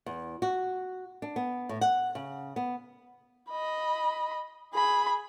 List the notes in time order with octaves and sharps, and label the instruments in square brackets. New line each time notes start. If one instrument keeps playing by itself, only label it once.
[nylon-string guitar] E2
F#4
D4
B3
A2
F#5
C#3
B3
[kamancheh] D#5 B5
G#4 B5